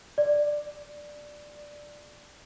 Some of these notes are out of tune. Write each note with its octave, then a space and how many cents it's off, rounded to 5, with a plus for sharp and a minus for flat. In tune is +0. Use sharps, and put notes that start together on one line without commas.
D5 +10